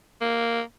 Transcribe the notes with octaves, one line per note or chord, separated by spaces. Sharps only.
A#3